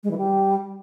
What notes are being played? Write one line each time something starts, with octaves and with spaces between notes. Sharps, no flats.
G#3
E3
G3